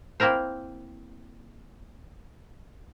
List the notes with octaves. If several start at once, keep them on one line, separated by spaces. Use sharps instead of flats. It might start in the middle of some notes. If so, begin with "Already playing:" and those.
A#3 C4 E4 A#4 C5